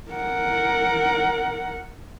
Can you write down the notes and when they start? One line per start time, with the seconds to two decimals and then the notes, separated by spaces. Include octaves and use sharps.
0.12 A#4 F#5